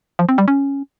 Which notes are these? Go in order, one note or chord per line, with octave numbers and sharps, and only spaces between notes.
F3
C4
G3
C#4